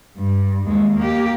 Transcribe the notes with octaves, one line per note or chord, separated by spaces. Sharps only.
G2
D#2 G#3
A#3 G4